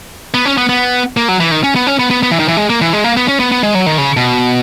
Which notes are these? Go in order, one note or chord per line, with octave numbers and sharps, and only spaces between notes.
B3
C#4
B3
B3
A#3
F#3
E3
D#3
C#4
B3
C#4
B3
B3
B3
E3
D#3
E3
G#3
A#3
E3
G#3
A#3
B3
C#4
B3
B3
G#3
F#3
D#3
C#3
B2